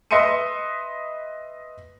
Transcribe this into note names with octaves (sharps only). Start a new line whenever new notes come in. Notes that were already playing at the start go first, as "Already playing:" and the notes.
B4 D#5 E5 C6 C#7 D#7